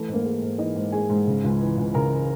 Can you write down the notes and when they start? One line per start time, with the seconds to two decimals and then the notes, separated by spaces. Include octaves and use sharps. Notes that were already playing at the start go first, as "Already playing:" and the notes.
Already playing: E3 A3 A4
0.08 G#2
0.13 A#3 A#4
0.25 G#3
0.42 G#2
0.58 E3 D#4 D#5
0.76 G#2
0.92 G#3 G#4 G#5
1.09 G#2
1.27 C#3
1.44 C#2
1.61 E3
1.78 C#2
1.94 C#3 A#4 A#5